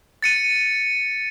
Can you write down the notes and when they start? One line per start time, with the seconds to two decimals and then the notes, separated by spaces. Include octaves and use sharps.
0.23 A6 C#7 D#7